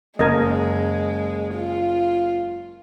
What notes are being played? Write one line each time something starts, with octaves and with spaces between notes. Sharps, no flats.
F#1 G#3 A#4 D#5 G#6
F4